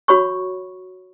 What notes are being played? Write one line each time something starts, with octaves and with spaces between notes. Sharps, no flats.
F#4 C#5 B5 C#6